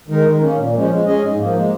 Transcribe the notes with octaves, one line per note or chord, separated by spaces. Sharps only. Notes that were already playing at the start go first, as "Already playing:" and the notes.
D#3 G#3 D#4 A#4
D#3
A#3 C#4
A#2
F3 G#3 C#4
G#3
C#4 G#4 D#5
G#2
F3 A#3
G#3